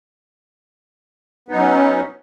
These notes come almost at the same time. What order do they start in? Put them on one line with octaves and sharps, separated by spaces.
B3 D#4 F#3 C#4